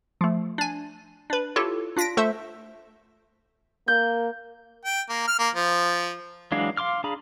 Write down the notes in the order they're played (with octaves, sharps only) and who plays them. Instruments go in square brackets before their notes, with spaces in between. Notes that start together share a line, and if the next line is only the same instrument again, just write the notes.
[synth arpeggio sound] F3 A3
D4 G#5
D4 B4
E4 F4 G4 A4 C#5
D4 F4 A#6 B6 D7
A3 A4 C5 E5
[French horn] A#3 [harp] G6
[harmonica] G5
A#3
F6
A#3
F3
[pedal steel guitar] E3 F#3 G#3 D4 F5
F5 C6 D6 F6
D4 G#4 F5 A#5 B5